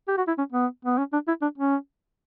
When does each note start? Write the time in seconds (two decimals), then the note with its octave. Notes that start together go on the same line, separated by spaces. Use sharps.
0.08 G4
0.17 F#4
0.28 E4
0.38 C#4
0.52 B3
0.85 B3
0.98 C#4
1.13 D4
1.28 E4
1.42 D4
1.58 C#4